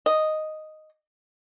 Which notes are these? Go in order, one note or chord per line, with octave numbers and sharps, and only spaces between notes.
D#5